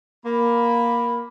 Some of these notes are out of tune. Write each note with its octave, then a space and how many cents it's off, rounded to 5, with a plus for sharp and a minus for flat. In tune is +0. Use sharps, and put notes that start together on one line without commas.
A#3 +10 B5 +0